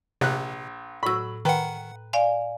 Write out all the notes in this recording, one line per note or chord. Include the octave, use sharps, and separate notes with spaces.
A#1 C3 F#6
A2 F#3 B5 E6
D#3 B4 F#5 G5 A#5
D5 F5 G#5